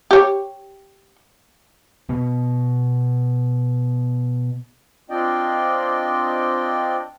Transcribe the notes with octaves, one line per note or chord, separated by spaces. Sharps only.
G4 C#5
B2 B3
C4 D4 F4 D5 D#5 G5